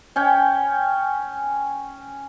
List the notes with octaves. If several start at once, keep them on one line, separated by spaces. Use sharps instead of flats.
C#4 G5 G#5